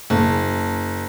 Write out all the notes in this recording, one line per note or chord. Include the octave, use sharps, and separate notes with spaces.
F#1